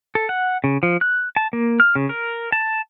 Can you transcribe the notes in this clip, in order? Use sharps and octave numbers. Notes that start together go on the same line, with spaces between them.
A4
F#5
C#3
F3
F#6
A5
A#3
F6
C#3
A#4
A5